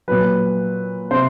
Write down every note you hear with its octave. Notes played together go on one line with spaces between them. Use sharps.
A#2 F#3 B4
C3 C5